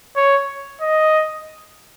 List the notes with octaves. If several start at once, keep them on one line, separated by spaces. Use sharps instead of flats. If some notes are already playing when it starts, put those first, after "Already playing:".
C#5
D#5